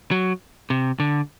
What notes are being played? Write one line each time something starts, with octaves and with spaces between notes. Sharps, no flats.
F#3
C3
D3